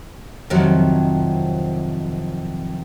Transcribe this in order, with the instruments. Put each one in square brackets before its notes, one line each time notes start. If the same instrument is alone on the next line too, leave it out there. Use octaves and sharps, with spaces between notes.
[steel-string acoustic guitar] F2 C3 D#3 F3 F#3